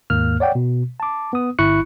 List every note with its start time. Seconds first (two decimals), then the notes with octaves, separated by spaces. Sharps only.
0.10 D#2 G#2 A#3 F6
0.40 C#5 D5 F#5 G5
0.55 B2
1.00 A5 D6
1.33 B3 D#6
1.59 G1 E4 B5 C#6 F#6 C#7